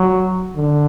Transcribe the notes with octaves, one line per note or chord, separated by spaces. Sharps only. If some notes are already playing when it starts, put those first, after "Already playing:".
Already playing: F#3
D3